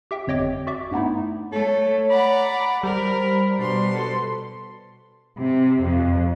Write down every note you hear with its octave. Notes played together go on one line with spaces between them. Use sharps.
G4 E5 G5
G1 F2 C#5 D#5 G5 D6
F#4 D5 E5 D6
G2 A3 B3 D#4 E4
A3 A4 C#5
D5 F#5 A#5 B5
G3 A#4 C5 B5
B2 D4 C6
A4
C3
F2